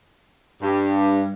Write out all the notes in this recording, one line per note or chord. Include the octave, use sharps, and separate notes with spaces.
G2